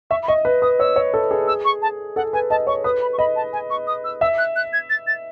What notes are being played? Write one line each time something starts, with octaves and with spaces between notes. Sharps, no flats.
E5 C#6
B5
D#5 C#6
B4
B4 D#6
C#5 E6
C#5
A4
G#4
E6
C#6
A5
A4 F#5
B4 G#5
D#5 A5
C#5 C#6
B4 D#6
B5
C#6
D#5 B5
A5
G#5
C#6
D#6
E6
E5 E6
F#6
F#6
G#6
A6
A6